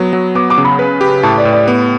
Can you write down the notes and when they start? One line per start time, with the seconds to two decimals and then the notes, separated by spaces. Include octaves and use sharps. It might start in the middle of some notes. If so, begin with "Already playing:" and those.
Already playing: F#3 B3
0.13 F#3
0.35 B3 D6
0.50 D6
0.58 C#3
0.65 B5
0.79 B4
1.01 G4
1.23 A2 A5
1.38 D5
1.45 A2
1.53 D5
1.68 B3